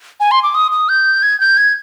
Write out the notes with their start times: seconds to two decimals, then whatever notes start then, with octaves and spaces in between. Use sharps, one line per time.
0.20 G#5
0.31 C6
0.43 D6
0.55 D#6
0.71 D#6
0.89 G6
1.23 G#6
1.40 G6
1.57 G#6